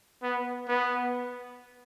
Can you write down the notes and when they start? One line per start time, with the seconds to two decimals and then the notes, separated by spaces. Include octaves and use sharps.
0.22 B3
0.68 B3